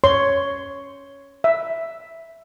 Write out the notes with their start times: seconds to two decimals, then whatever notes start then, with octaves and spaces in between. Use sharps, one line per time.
0.04 C#5 C6
1.44 E5